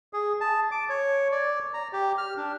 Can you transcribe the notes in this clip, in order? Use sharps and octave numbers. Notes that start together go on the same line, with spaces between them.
G#4
A5
D6
C#5
D5
A#5
G4
F6
D4